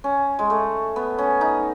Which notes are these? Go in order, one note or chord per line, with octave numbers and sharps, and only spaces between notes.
C#4
G#3
A3
B3
C#4
D#4